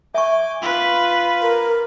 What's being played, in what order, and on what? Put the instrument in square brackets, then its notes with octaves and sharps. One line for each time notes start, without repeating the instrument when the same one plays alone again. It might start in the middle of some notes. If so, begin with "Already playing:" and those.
[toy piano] E5 C#6 [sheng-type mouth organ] G#5 D6 G6
[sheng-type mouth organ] F4 B5 [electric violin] B4
[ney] A#4